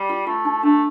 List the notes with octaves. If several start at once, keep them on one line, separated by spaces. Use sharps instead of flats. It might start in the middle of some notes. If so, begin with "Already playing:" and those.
Already playing: G3
F4
A3 F4
D#4
A3 D4